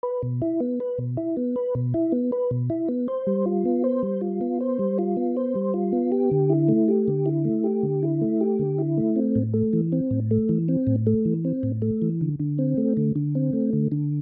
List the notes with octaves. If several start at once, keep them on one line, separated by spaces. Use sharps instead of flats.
B4
B2
E4
B3
B4
B2
E4
B3
B4
B2
E4
B3
B4
B2
E4
B3
C5
G3
F4
B3
C5
G3
F4
B3
C5
G3
F4
B3
C5
G3
F4
B3
G4
D3
E4
A3
G4
D3
E4
A3
G4
D3
E4
A3
G4
D3
E4
A3
C4
A2
A3
E3
C4
A2
A3
E3
C4
A2
A3
E3
C4
A2
A3
E3
D3
D3
C4
A3
D3
D3
C4
A3
D3
D3